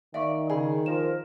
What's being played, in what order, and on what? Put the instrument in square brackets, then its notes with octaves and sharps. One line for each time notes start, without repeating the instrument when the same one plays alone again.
[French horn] D#3 [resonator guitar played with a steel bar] D5 [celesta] E5 F5 C#6
[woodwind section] C#3 [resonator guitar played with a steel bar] G#4 [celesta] G#5 B5
[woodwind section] F3 A#4 [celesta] E7